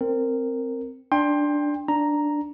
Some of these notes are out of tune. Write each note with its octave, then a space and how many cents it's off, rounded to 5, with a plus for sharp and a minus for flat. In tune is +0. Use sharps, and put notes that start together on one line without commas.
C4 +0 A#4 -15
D4 +0 G5 +25 C6 +15
D4 +0 A#5 +0